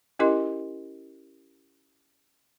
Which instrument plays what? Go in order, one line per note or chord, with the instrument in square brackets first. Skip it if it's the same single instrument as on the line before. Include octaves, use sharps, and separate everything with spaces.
[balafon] C#4 E4 G4 A#4 D#5 C6